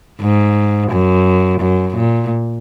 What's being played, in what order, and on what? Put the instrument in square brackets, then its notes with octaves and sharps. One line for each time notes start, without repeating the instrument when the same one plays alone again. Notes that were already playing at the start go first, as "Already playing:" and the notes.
[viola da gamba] G#2
F#2
F#2
A#2